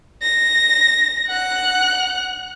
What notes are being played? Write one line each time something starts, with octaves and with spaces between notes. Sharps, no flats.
A#6
F#5 F#6